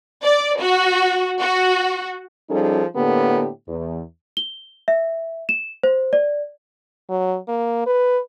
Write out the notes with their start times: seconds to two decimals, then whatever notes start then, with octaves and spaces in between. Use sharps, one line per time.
0.24 D5
0.60 F#4
1.40 F#4
2.50 F3 G3 C#4 D#4 G#4 A4
2.95 A2 D3 A#3 B3 G4 A4
3.68 E2
4.37 G7
4.88 E5
5.49 E7
5.83 C5
6.13 D5
7.10 F#3
7.48 A#3
7.86 B4